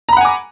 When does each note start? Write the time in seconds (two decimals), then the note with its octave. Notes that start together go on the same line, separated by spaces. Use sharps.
0.09 A#5
0.13 B5
0.17 F#5
0.21 G#5
0.25 D6